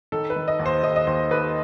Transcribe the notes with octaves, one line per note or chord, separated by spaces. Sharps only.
D#3 A4
B4
D#3
D#5
D#2
C5
D#2 D#5
D#5
D#2 C5
D#2 B4